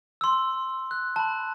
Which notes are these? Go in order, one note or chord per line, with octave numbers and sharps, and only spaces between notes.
C6 E6
F#6
A5 B5